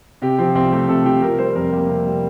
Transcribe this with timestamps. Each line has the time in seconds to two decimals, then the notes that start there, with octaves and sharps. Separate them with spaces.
0.22 C3 G4
0.39 F3 C4
0.55 C2 C4
0.72 A3 G4
0.89 C3 A4
1.05 F3 G4
1.22 C3 A#4
1.38 G3 C5
1.55 F2 A#4
1.72 A#3 G4
1.89 C3
2.06 G3